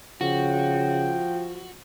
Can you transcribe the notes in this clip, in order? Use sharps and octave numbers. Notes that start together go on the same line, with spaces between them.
C#3 F3 F#4 G5